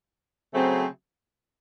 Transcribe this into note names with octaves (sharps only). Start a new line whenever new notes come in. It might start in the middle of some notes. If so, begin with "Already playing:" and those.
C#3 F#3 A3 C4